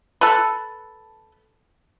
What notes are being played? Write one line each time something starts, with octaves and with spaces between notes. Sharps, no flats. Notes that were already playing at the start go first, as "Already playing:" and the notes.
A4 B4